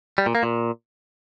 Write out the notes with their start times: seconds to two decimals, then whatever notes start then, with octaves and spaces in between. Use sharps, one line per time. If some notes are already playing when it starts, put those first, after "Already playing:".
0.18 G3
0.26 A#2
0.35 A#3
0.43 A#2